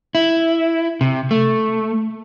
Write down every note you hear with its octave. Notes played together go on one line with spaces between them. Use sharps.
E4
C3
A3